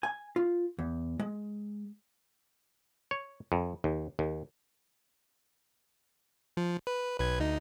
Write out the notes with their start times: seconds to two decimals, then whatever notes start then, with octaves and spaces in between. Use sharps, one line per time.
0.03 G#5
0.36 F4
0.79 E2
1.19 G#3
3.11 C#5
3.52 F2
3.84 D#2
4.19 D#2
6.57 F3
6.87 B4
7.19 B1 B4 G#6
7.40 D2 D#4